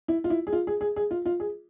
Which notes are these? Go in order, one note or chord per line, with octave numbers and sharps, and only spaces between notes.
E4
F4
E4
G#4
F4
G#4
G#4
G#4
F4
F4
G#4